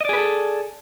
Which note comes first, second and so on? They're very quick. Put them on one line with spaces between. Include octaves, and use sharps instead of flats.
D#5 D5 G#4 B4 A4